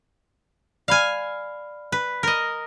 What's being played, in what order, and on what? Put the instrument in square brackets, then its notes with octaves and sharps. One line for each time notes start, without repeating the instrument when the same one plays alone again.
[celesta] D5 B5 F6 [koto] F5 G#5
[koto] B4
A#4 D#5